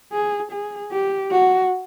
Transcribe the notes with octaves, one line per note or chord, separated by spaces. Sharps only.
G#4
G#4
G4
F#4